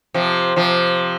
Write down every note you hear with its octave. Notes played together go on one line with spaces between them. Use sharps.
C3 F3
C3 F3